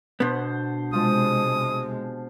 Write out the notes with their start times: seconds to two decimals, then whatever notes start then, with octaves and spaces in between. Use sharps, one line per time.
0.20 B2 D3 B3 C5
0.93 C3 F3 G#3 F4 D#6